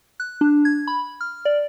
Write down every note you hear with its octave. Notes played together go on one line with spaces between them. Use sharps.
F#6
D4
G#6
B5
F6
D5